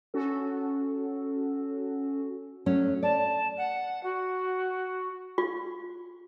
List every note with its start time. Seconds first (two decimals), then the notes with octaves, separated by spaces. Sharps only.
0.14 C#4 F#4 A4
2.66 F#3 A3 C#4
3.03 D5 A5
3.57 F#5
4.03 F#4
5.38 F4